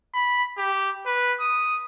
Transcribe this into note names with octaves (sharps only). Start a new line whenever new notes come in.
B5
G4
B4
D#6